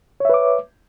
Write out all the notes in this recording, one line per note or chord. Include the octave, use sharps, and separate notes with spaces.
B4 C#5 E5 D6